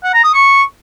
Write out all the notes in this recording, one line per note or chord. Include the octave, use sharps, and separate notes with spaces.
F#5
A#5
D#6
C#6